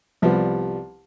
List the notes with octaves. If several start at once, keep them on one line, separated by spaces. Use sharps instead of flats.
C2 F3 G3 B3